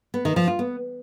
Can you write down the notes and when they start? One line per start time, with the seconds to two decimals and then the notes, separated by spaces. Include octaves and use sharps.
0.14 B3
0.25 D#3
0.36 F3
0.48 F4
0.59 B3